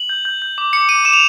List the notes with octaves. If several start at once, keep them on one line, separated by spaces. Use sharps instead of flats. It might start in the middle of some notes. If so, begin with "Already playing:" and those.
Already playing: F#7
G6
G6
G6
D6
D6 C#7
D6 D#7
D6 E7
F7